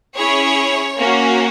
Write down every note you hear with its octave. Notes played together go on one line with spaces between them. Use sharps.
C#4 E4 G#4 C#5
A#3 C#4 F#4